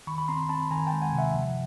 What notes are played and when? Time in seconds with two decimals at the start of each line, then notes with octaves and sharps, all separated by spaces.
0.07 D#3 B5 C#6
0.18 B5
0.28 C4 A#5 C6
0.49 C4 A5 B5
0.71 D#3 G#5 A#5
0.86 G5 A5
0.92 G#3
1.02 F#5 G#5
1.13 C3
1.18 E5 F#5
1.34 F3